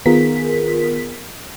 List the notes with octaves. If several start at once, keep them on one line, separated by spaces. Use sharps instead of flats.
D#3 B3 F4 G#4 A#4 B6